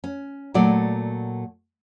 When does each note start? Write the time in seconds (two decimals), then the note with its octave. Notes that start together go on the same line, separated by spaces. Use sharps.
0.04 C#4
0.54 A#2 F#3 A3 D5